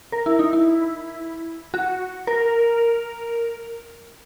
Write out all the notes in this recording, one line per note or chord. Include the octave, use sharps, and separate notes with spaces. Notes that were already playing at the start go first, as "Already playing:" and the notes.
A#4
E4
D#4
E4
F#4
A#4